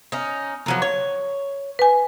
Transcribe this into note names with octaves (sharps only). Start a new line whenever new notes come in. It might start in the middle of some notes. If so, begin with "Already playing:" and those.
C#4 D#4
F3 F#3 A#3
C#5
B4 G#5